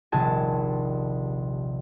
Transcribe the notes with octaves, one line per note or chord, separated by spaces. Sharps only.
D#1 A#1 C3 G#4 A5